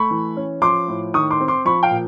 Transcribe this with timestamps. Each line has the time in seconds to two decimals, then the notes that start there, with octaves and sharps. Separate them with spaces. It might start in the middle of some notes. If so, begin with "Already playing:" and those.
Already playing: A3 B5 C#6
0.11 E3
0.37 C#4
0.62 F3 C6 D6
0.88 A2
1.14 D#3 C#6 D#6
1.31 C6 D6
1.40 C4
1.48 C6 D6
1.65 F3 B5 C#6
1.83 F5 G5
1.91 A#2